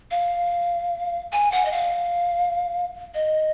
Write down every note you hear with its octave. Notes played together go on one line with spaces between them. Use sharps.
F5
G#5
F#5
D#5
F5
D#5